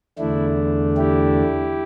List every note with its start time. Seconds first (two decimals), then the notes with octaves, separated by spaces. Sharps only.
0.19 E2 D3 A3 D4 E4
0.97 E4 G4